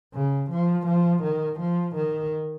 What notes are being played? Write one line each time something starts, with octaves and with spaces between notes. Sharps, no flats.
C#3
F3
F3
D#3
F3
D#3